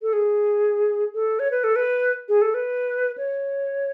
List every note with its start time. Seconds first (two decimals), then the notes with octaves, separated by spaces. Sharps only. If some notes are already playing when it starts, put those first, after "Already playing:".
0.02 A4
0.13 G#4
1.14 A4
1.39 C#5
1.51 B4
1.64 A4
1.76 B4
2.29 G#4
2.42 A4
2.54 B4
3.18 C#5